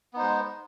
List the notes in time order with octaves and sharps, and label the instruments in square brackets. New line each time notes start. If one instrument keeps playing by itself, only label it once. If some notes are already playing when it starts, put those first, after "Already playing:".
[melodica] B3
D#4
C5
G#3